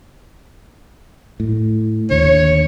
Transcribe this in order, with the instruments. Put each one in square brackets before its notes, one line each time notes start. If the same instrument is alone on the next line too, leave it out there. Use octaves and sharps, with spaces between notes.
[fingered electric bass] A2
[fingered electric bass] D#2 D3 [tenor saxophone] C#5